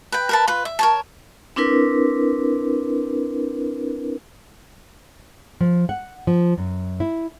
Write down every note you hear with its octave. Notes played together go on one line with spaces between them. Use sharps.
B4 G5
A#4 B4 A5
F4 B4
E5
A#4 C#5 A5
C4 D4 E4 A#4 B4
F3
F#5
F3
F#2
E4